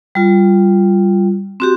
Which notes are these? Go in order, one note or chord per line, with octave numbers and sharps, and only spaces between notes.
G3 F4
C4 F#4 G4